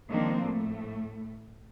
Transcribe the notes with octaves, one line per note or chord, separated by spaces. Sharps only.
D#3 F3 G#3 A#3 C4 D4
A2 A3